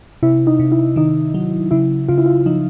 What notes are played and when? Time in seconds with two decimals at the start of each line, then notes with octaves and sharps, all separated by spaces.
0.23 C3 E4
0.47 D#4
0.59 C3
0.72 E4
0.96 D#3 D#4
1.34 F#3
1.71 C#3 E4
2.08 C#3 F4
2.18 E4
2.26 F4
2.46 F3 D#4